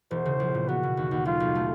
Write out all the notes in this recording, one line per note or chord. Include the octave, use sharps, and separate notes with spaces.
E1 C5
C#3
A#1
A#2
B3 F#4
B2
D#2
D#2
B1 F4
B1
A3